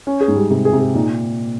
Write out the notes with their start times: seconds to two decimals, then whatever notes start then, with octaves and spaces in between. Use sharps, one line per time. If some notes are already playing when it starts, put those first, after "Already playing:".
0.07 C#4
0.21 G#4
0.28 G#2
0.36 G3
0.50 C3 G#4
0.65 G#4
0.73 C3
0.80 G#4
0.94 A#2 D#4